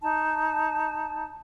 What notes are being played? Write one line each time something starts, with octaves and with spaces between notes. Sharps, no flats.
D#4 A5